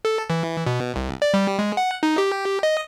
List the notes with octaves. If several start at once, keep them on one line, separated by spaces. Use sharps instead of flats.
A4
E3
B2
C2
D5
G3
G#3
F#5
D#4
G4
D#5